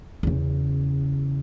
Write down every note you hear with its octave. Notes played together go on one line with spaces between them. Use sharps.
E2 C#3